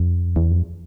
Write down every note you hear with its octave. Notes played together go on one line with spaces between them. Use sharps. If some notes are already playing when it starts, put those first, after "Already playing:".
Already playing: F2
E2
F2